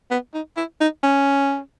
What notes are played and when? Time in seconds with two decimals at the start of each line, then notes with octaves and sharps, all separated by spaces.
0.11 B3
0.34 D#4
0.57 E4
0.80 D#4
1.03 C#4